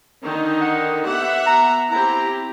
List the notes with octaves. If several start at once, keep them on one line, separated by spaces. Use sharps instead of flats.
D3 D#3 D#4
F#5
B3 G4 E5 F#5
A#5
C4 E4 G4 A#5